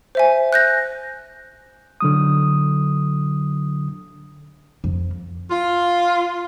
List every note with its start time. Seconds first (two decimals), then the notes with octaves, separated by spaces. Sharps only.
0.15 C5 E5 G#5
0.53 F#6 G6 A#6
2.01 D3 F#3 D#6
4.84 F2
5.51 F4